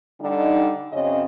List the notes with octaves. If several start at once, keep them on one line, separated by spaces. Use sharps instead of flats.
D3 G3 D#4
F#2 C#3 C4 C#4 D#5